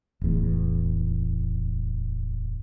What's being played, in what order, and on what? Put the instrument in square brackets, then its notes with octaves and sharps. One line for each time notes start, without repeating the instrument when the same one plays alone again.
[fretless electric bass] D1 E2